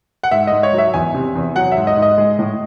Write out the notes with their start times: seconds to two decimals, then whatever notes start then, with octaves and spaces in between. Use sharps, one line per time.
0.23 F#5
0.31 G#2 E5
0.47 G#2 D#5
0.63 C#5
0.73 F#3
0.78 E5
0.94 E2 G#5
1.14 C3
1.35 E2
1.56 F#3 F#5
1.72 E5
1.77 G#2
1.87 D#5
1.97 G#2
2.02 D#5
2.18 G#3
2.39 A2